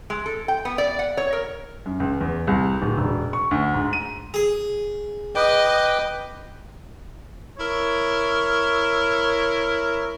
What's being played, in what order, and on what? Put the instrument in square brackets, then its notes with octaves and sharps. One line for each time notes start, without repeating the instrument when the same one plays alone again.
[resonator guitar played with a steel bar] G#3
A4
G5
B3
D5
F#5
C#5
A#4
[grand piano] F#2
C#2
E2
C2
D1
E1
C#6
D2
G#2
D#7
[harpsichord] G#4
[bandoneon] B4 G5 D6 [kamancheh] D#5
[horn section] E4 A#4 C#5